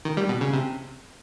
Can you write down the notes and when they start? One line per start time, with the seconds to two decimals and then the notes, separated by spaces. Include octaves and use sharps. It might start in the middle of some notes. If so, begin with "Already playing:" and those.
0.05 D#3
0.17 G3
0.29 B2
0.41 C#3
0.53 C3